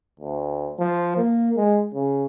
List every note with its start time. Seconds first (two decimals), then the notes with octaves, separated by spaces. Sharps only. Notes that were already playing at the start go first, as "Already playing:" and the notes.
0.20 D2
0.79 F3
1.17 A#3
1.57 G#3
1.94 C#3